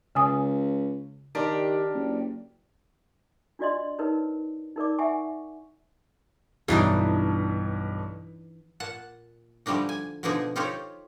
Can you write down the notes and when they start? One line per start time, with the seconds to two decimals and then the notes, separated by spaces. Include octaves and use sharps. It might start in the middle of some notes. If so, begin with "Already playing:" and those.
0.15 C#2 C#3 G#5 D#6
1.35 D#3 D4 G4 A#4
1.94 F#1
3.59 D4 F4 F#4 D5 D#5 C6
3.99 D#4 A#4 B4 C#5
4.76 D#4 A#4 D5 D6
4.98 E5 F#5 G#5 C#6
6.68 B1 G2 E3 D4 D#4
8.80 A#2 F#5 A5
9.66 D3 F3 G3 A3 D4 D#4
9.89 G#5
10.23 B2 D3 F3 D4 D#4 G#4
10.56 D#4 F4 G4 A4 C5 C#5